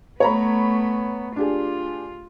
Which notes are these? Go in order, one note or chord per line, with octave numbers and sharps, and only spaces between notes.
A3 B3 C#5 A#5 B5
D4 F4 G4 G#4